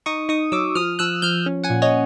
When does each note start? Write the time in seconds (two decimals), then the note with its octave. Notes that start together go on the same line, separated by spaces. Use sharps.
0.06 D#4 C#6 D#6
0.29 D#4 C#6 D#6
0.52 F#3 D6 E6
0.75 F3 D#6 F6
0.99 F3 E6 F#6
1.22 F3 F6 G6
1.46 C#4
1.64 F#5 G#5
1.70 A#2
1.82 C#5 D#5